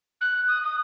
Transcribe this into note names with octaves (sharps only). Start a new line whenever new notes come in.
F#6
D#6
D#6